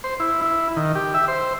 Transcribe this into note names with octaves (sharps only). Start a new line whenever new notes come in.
C5
E4
E4
D#3
G4
E5
C5